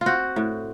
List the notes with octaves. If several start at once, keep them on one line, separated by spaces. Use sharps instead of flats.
C4 F4 F#4
A2